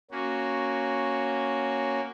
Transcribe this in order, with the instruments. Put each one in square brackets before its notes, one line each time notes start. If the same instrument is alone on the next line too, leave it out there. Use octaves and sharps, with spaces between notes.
[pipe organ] A#3 C#4 F#4